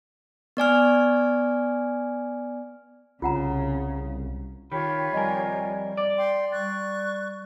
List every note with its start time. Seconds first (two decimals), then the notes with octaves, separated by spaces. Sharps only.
0.57 B3 D5 G#5 F6
3.22 C2 C#3 F4 F#5 A#5
4.72 D#3 F4 G4 C#5 B5
5.14 F2 G3 A#4 D#5 G#5
5.97 D5 D6
6.18 G5 C6
6.52 G3 C#6 F#6 A6